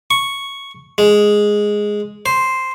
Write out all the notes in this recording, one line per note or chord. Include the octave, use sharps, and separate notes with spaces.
C#6
G#3
C5